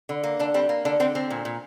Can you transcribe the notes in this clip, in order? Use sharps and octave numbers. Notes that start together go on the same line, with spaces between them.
D3
A#3
D3 D4
G3 C4
A#3
D3 D4
D3 C4
D3 C4
A#2
A#2